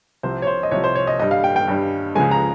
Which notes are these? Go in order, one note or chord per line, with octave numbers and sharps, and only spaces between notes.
C2 C3 F3 C5
C#5
C5
D#5
C2 C3 F3 C#5
C5
C#5
D#5
G2 G3 D#5
F5
G5
G5
G2 G3
C#2 C#3 F3 G#3 G#5
A#5